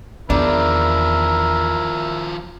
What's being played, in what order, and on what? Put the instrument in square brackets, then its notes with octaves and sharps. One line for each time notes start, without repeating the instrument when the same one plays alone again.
[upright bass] E2 [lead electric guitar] D#3 F3 [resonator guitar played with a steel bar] D4 [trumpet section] E4 A#4